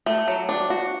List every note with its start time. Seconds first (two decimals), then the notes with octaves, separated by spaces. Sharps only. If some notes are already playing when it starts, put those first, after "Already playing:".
0.06 A3
0.28 F#3
0.49 D4
0.70 F#4